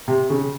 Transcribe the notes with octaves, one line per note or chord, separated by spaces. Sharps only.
C3
C#3